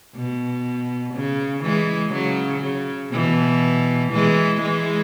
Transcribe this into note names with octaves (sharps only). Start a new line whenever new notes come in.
B2
C#3
E3 G#3
C#3 F#3
C#3
B2 E3
E3 G#3
E3 G#3